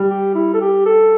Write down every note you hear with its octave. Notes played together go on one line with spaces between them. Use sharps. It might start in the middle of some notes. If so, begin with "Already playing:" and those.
Already playing: G3
G4
E4
A4
G4
A4